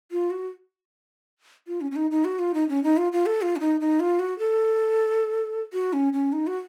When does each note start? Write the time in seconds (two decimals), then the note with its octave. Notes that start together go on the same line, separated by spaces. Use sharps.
0.11 F4
0.31 F#4
1.67 F4
1.81 C#4
1.91 C#4
1.96 D#4
2.11 D#4
2.25 F#4
2.39 F4
2.54 D#4
2.69 C#4
2.84 D#4
2.97 F4
3.12 F4
3.26 A4
3.42 F4
3.56 C#4
3.60 D#4
3.81 D#4
4.00 F4
4.19 F#4
4.39 A4
5.73 F#4
5.93 C#4
6.13 C#4
6.33 D#4
6.47 F#4